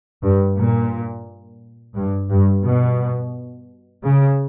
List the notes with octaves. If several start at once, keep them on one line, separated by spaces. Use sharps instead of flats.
G2
A#2
G2
G2
B2
C#3